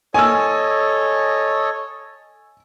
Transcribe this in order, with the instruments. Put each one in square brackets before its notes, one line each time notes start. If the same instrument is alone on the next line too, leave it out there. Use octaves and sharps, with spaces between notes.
[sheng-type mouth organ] A4 C#5 D#5 [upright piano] G#5 E6